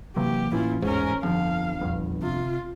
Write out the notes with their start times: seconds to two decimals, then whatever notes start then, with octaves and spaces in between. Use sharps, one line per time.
0.16 C3 E3 F#3 A#3 G4
0.52 A2 E3 C#4 E4 F4
0.82 A1 E2 G#2 C#4 A#4
1.23 G1 F2 F3 F5
1.81 A#1 E2 G2
2.22 C3 F4